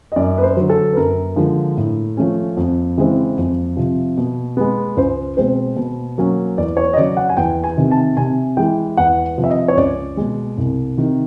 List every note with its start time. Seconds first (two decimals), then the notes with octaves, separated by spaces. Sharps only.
0.12 D#5
0.16 F#2 D5
0.38 B4
0.43 C5
0.56 D3 F#3
0.70 A4
0.93 B4
0.97 F#2 A#4
1.36 D3 F3 G#3
1.77 A2
2.17 F3 A3 C#4
2.57 F2
2.97 C#3 E3 G#3 C4
3.37 F2
3.77 C3 F3
4.18 B2
4.57 G#3 B3
4.97 C#2 C5
5.37 B2 G#3 C4 C5
5.77 B2
6.18 F#3 A#3 C#4
6.58 E2 D5
6.77 C#5
6.93 D#5
6.97 C#3 F#3 D5
7.17 F#5
7.29 G#5
7.37 E2 G5
7.64 G#5
7.77 C3 D#3
7.91 A5
8.17 C3 G#5
8.57 E3 G#3 G5
8.97 E2 F#5
9.38 C3 F3
9.44 E5
9.50 D#5
9.68 C#5
9.77 C#2 D5
10.17 B2 G#3
10.58 C2
10.98 C3 D#3